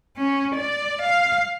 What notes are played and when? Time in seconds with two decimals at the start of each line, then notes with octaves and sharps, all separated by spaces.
0.18 C#4
0.56 D5
1.02 F5